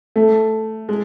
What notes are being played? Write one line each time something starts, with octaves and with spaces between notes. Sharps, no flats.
A3
G#3